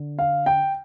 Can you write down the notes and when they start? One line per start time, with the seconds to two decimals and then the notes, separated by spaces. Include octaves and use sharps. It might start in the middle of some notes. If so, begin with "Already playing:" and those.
Already playing: D3
0.19 F5
0.46 G5